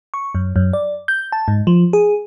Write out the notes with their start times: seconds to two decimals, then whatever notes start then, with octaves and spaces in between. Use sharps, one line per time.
0.14 C#6
0.35 F#2
0.56 F#2
0.73 D5
1.08 G6
1.32 A5
1.48 G#2
1.67 F3
1.93 G#4